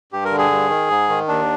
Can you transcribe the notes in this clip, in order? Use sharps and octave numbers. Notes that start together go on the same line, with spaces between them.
G2 G4
A#4
D3
G#4
G2
D#3
G#2
D#3
D#2 D4